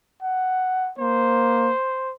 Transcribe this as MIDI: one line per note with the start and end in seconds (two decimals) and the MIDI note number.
0.22 0.91 78
0.99 1.72 58
0.99 2.12 72